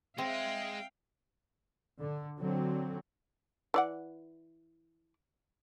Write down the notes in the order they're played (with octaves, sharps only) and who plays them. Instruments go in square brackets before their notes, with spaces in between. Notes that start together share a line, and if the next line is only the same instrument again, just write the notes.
[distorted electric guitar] G#3 [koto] C4 [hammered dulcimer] E5 [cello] F5 G5
[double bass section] D3
D3 F#3 C4
[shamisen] E3 D5 F#5